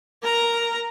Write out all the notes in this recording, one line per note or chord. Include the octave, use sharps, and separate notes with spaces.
A#4 A#5